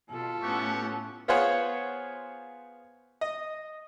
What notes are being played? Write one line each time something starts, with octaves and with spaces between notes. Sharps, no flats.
B2 F4 A4
A2 B3 C#4 G4 F#5 C#6
B3 F4 G#4 C5 C#5 F#5
D#5